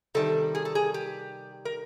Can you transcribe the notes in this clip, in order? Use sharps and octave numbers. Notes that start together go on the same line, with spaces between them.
C3 D#3 G3 A4
G#4
A4
G#4
G4
A#4